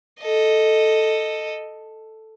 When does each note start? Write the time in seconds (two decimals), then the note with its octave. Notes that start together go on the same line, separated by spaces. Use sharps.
0.21 A4 D#5